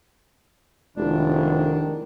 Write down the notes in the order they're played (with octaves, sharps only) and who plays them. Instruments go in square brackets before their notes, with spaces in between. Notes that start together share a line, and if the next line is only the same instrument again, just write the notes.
[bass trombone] F1 [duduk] D#3 [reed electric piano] G#3 E4 G4 [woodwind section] D4